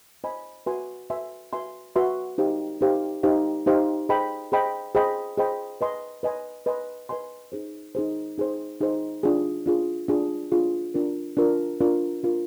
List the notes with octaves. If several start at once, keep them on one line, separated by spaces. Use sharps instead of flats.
C5 D#5 G#5 B5
F#4 B4 E5 G#5 C6
F#4 B4 E5 G#5 C6
F#4 B4 E5 G#5 C6
F#4 B4 E5 G#5 C6
D#4 G4 C5 F5
D#4 G4 C5 F5
D#4 G4 C5 F5
D#4 G4 C5 F5
G#4 C5 D#5 G5 B5
G#4 C5 D#5 G5 B5
G#4 C5 D#5 G5 B5
G#4 C5 D#5 G5 B5
B4 D#5 G#5 C6
B4 D#5 G#5 C6
B4 D#5 G#5 C6
B4 D#5 G#5 C6
D#4 G#4 C5
D#4 G#4 C5
D#4 G#4 C5
D#4 G#4 C5
D4 F4 G#4
D4 F4 G#4
D4 F4 G#4
D4 F4 G#4
D4 F4 A#4
D4 F4 A#4
D4 F4 A#4
D4 F4 A#4